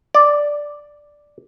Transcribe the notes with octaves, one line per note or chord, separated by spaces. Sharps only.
D5